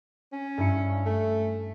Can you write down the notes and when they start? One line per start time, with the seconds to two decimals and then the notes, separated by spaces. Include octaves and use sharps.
0.33 C#4
0.58 G2 E4 C#7
1.06 A3